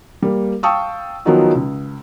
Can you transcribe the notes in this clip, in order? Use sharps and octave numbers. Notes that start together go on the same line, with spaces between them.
G3 A#3
F5 G5 A5 C#6 D#6 E6
D#3 F3 F#3 B3 D#4 F#4
C#2